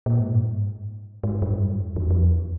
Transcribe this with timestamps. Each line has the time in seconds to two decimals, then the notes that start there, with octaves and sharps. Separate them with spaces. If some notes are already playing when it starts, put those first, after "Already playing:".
0.06 A#2
0.20 G#2
0.35 G2
0.50 G#2
1.24 G#2
1.42 G2
1.62 F#2
1.82 F2
1.96 E2
2.11 F2
2.25 E2